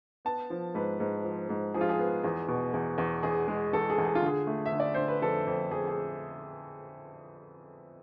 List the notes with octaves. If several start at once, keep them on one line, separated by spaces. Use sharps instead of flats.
B3 A5
F3
G#2 B4
G#2
F3
G#2
F3 G#4
F4
G#4
B3
E2
B2
E2
E2
E2 G#4
G#3
E2 A4
G#4
E2
G#4
F4
D3 G#4
A3
E5
D3
D5
D3 C5
B4
F2 A4
F2
F2 G#4
G#4